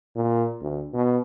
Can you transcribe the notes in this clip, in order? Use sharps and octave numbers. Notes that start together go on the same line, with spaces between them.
A#2
D2
B2